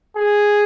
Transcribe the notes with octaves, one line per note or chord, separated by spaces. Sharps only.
G#4